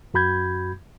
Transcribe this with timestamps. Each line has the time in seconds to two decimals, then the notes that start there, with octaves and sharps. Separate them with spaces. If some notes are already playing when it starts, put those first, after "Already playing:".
0.14 F#2 F#4 B5 G6 G#6